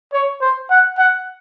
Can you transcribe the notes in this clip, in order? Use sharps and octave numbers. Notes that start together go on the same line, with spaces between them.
C#5
C5
F#5
F#5